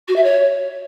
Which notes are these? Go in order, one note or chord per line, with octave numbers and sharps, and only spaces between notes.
F#4
E5
C#5